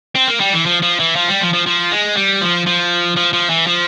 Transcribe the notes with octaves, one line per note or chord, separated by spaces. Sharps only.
C4
A#3
G3
E3
F3
F3
E3
F3
G3
F3
F3
F3
G#3
G3
F3
F3
F3
F3
E3
F3